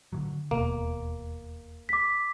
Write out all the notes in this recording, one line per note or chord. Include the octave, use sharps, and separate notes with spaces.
D3 E3 F#3
E1 D#2 B2 A#3
D6 B6